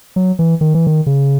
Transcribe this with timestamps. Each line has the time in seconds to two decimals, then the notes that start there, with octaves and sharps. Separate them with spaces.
0.16 F#3
0.39 E3
0.61 D#3
0.74 E3
0.87 D#3
1.06 C#3